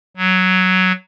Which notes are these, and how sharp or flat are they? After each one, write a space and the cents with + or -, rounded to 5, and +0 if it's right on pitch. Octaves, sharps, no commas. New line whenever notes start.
F#3 +5